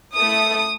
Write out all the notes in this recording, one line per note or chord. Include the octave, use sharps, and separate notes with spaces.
A3 E4 A4 D#6